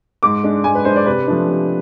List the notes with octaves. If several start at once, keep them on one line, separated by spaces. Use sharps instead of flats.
G#2 D6
G#3 D4
G#2 G#5
B4
G#3 D4 C5
D5
C3 B4
F3 A3 D4
C3